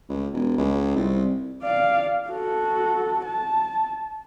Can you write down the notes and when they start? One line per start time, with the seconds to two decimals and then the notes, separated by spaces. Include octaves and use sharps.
0.09 C#2
0.33 E1
0.58 C#2
0.96 C2
1.62 D5 F5
2.29 F#4 A4
3.25 A5